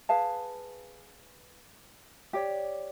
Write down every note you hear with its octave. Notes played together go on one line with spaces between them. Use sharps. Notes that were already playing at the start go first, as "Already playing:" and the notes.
G#4 B4 F5 A5
G4 C#5 D5